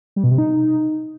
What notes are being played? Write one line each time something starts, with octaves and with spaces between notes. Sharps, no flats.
G3
B2
C3
D#4